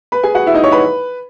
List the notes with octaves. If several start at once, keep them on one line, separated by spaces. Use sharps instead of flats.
B4 B5
G#4 G#5
F#4 F#5
E4 E5
D#4 D#5
C#5 C#6
B4 B5